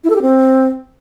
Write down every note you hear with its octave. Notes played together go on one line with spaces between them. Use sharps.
E4
A4
G4
C4